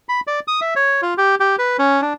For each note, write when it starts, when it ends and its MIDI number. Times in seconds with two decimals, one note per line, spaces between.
0.09 0.20 83
0.27 0.40 74
0.48 0.60 87
0.61 0.74 76
0.76 1.01 73
1.02 1.14 65
1.18 1.35 67
1.40 1.56 67
1.58 1.77 71
1.79 2.01 61
2.02 2.13 62